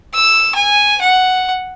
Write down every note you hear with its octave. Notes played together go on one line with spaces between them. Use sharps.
E6
G#5
F#5